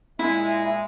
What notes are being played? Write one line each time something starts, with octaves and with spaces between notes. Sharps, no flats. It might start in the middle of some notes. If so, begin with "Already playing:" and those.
A#2 G#3 E4 E5